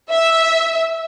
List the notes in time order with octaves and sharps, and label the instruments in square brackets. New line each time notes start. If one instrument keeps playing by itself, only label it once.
[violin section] E5